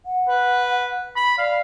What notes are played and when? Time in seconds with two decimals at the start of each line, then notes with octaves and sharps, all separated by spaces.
0.06 F#5
0.28 B4
1.16 B5
1.38 D5 F5